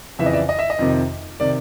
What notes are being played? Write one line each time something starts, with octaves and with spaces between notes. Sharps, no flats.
F2 C#3 E3 E5
D#5
D5 E5
D#5
E5
D#5
F2 C3 D#3
C3 D#3 D5